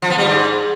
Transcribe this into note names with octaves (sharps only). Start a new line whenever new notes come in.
F3
B3
G3
G#2